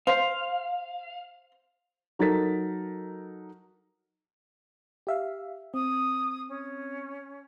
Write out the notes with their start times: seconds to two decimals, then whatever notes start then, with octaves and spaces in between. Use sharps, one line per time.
0.07 C5 F5
2.19 F#3 D#4 A4 A#4 A6 B6
5.07 G4 E5 F5
5.74 C4 D#6
6.48 C#4